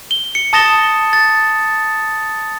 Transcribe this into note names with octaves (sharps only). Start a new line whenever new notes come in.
G7
C#7
A5 D#6 A6 A#6 E7 G7
A6